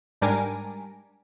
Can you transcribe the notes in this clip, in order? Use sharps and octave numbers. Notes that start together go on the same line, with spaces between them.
G#2 G3 D4 A#4 G#5 D6